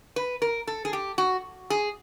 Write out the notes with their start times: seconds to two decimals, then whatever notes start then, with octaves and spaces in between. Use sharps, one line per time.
0.16 B4
0.42 A#4
0.67 A4
0.85 G#4
0.93 G4
1.18 F#4
1.70 G#4